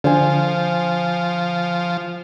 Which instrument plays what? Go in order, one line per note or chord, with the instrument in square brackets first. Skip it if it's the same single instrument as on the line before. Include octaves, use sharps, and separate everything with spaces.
[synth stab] D3 [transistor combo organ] F3 [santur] C5 G#5